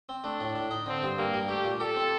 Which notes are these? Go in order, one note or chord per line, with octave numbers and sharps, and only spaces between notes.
C4
A3 D4
A2
A2
D#4
D3 C4
G2
G2 A#3
G3
A3 G4
A#2
G4 A4
C4